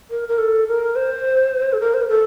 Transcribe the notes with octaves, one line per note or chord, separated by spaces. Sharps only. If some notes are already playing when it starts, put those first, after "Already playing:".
A#4
A#4
A4
A#4
C5
A4
A#4
C5
A#4
A4